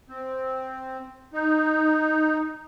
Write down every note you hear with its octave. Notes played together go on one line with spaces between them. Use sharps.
C4
D#4